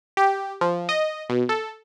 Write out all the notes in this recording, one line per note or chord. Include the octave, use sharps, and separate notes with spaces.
G4
F3
D#5
B2
A4